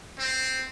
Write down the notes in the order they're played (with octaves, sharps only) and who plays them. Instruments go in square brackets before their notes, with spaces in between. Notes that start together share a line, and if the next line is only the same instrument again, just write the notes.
[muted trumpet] C4